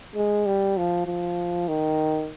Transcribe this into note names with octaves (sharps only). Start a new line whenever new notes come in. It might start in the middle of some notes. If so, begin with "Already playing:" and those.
G#3
G3
F3
F3
D#3